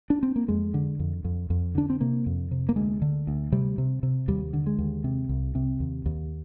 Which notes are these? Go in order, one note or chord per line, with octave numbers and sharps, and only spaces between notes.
D4
C4
A#3
F2 G#3
D3
F2
F2
F2
D3 D4
C4
C3 A#3
F2
C3
A#3
D2 G#3
D3
D2
C3 G3
C3
C3
D#2 G3
D3
G#3
D#2
C3
C2
C3
D#2
D#2